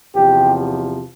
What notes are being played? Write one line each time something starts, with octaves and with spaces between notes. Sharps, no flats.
E2 C3 F3 G4